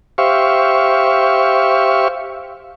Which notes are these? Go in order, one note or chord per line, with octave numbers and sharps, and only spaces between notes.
G4 C5 E5 F5 C#6